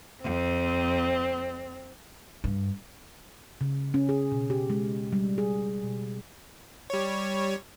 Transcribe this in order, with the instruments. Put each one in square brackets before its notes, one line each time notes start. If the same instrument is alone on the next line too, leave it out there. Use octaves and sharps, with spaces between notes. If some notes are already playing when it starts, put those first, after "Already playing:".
[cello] F2 [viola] C4
[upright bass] G2
[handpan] C#3
C#4
G#4
B2
G4
G#3
G3
G#4
B2
[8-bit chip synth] G3 C#5